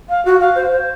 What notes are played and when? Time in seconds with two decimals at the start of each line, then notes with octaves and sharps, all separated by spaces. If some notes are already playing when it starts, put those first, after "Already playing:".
0.09 F5
0.25 F#4
0.41 F5
0.55 C5
0.72 C5